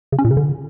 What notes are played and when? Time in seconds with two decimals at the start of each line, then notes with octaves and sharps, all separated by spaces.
0.12 C#3
0.19 C#4
0.25 A#2
0.31 C#3
0.37 D3